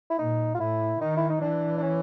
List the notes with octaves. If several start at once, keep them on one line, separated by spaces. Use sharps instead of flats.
E4
A#2 D#4
F4
A2 E4
D#3 D#4
E4
D#4
E3 D4
D4
C#4